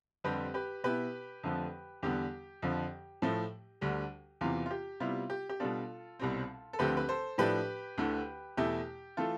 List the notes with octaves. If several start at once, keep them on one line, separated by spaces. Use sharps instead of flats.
F2 D3 G3 C4 G4 B4
G4 B4
B2 B3 E4 G4 B4
F2 D3 F3 A3
E2 D3 G3 B3 G4
F2 D3 F3
A2 F3 A3
D2 D3 G3
E2 C3 E3 F4
F4
G4
C3 G3 B3 E4 F4
G4
G4
B2 G3 B3 D4 F4 A4
C2 B2 G3 C4
A4
D2 D3 F3 A3 C4 G4 B4
B4
A4 C5
A2 F3 A3 D4 G4 B4
D2 D3 A3 E4
E2 B2 A3 E4 G4
E3 A3 F4 A4